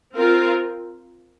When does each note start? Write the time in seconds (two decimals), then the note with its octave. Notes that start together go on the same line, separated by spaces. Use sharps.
0.16 C4 F4 A#4